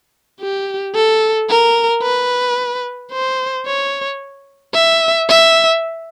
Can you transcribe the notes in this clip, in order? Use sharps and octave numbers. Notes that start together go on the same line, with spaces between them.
G4
A4
A#4
B4
C5
C#5
E5
E5